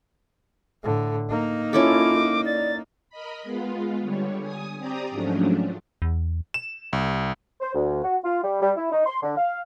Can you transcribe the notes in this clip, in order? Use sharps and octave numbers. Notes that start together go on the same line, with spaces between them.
A2 D3
A#3 D#4
C#4 E4 F4 A4 D6
D5 A6
A#4 D#5 B5
G#3 B3 F4
D3 G3 C#5
G#5 D#6
C4 G4 D5 A#5 D#6
G#2 F3 F#3 A3 C#4 D4
E2
E7
C2
C5
D2
F#4
F4
G3
G3
E4
D#4
C6
D3
F5